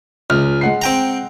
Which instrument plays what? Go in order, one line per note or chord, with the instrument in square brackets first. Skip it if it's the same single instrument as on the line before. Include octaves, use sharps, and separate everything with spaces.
[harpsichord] C#2 [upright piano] F6
[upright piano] G#3 F#5 C7
[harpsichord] C4 G5 A#5